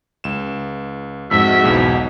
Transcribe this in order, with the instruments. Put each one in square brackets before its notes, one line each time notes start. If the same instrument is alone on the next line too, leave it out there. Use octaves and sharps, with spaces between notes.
[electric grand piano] C#2 E7
[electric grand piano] F2 [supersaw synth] G#2 [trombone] F#4 [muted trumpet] E5
[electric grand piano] B1 E2 B2